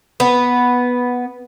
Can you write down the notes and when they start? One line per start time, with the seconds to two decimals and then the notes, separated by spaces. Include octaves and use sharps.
0.20 B3